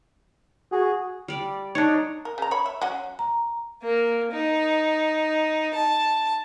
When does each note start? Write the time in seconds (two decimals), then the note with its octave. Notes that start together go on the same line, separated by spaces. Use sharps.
0.72 F#4 G#4
1.28 G3 D5
1.75 D4 D#4 C#5
2.25 A#4
2.38 C#3 A#5
2.51 C#5 B5
2.66 E5
2.82 F#3 C#4 F#4
3.19 A#5
3.83 A#3
4.32 D#4
5.74 A5